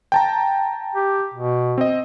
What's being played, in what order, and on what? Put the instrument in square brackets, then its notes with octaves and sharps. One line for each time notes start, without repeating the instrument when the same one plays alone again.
[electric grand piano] G5 A5 A#5
[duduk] G4
B2
[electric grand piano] C4 D#5